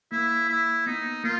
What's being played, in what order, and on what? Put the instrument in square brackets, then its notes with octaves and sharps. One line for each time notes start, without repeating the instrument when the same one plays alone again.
[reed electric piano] A#3 [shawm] E4
[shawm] E4
[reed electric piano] B3 [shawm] D#4
[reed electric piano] A#3 [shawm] F4